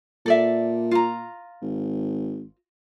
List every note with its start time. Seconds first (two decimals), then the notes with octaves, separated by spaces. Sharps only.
0.26 A#2 A4 D5 E5
0.91 F4 A#5
1.62 G#1